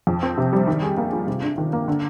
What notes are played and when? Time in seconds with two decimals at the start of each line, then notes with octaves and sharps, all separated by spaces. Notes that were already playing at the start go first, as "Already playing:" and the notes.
0.07 F2
0.23 C4
0.38 C3
0.53 G3
0.67 D#3
0.83 G#4
0.97 A#3
1.13 F4
1.27 C3
1.42 D4
1.58 D#3
1.73 A#3
1.88 D3